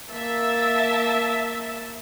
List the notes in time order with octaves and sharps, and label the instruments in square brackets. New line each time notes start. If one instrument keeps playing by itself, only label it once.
[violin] A#3 A5 [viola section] E5